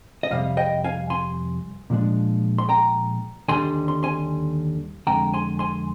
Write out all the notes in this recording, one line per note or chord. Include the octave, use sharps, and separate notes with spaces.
D#5
F2 C3 G3 F5
D#5 G5
F5 G#5
G#5 C6
A#2 F3 G#3 D4
C6
G5 A#5
D#2 D3 G3 D4 G#5 C6
C6
G#5 C6
F2 D3 G#3 G5 A#5
G#5 C6
G#5 C6